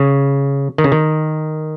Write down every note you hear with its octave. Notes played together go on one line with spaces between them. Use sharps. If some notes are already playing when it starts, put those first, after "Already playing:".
Already playing: C#3
D#3
C#3
D#3